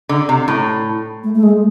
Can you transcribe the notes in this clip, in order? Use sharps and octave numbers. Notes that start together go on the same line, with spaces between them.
D3
C3
A2
A3
A3
G#3